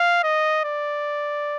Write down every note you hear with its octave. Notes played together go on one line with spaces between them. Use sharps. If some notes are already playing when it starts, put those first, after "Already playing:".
Already playing: F5
D#5
D5